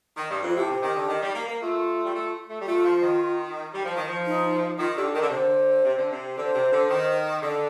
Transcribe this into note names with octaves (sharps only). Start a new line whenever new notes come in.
D#3
G2
F2
F4
A2 G4
C3
D#3
D3
D#3
G3
A#3
A#3
A3 F4
G3
A3
A3
G3
A3 F4
F3
D#3
G3
F3
D#3
F3
D#4
D#3 F4
D3 G4
D#3 A#4
D3
C3 C5
D3
C3
D3
C3
D3 C5
C3
D3
D#3
D3 D5